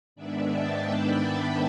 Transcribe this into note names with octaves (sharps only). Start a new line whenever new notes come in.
G#2 D#3 G#3 B3 D4 D5 E5
G5 A5
A5 B5